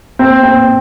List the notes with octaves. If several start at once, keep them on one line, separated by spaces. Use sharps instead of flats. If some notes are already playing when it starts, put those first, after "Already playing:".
C4
C4